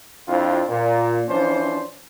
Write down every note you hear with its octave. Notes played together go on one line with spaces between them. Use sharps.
F2 C4 D4 E4 F4
A#2
E3 F3 C#4 D4 C5